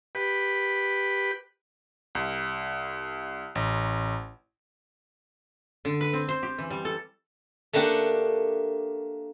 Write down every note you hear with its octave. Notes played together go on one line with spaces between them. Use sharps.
G4 B4
C2
A1
D3
B4
C4
C5
G4
E3
G3
A4
A3 A#3 D4 G4 F#5